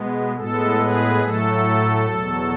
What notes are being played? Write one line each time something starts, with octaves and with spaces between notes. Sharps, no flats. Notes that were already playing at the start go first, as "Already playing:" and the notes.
Already playing: B2 G#3 B3
A2 G#3 B3 A4
G#4 B4
A2 F#3 A3 A4
E2 B2 F#3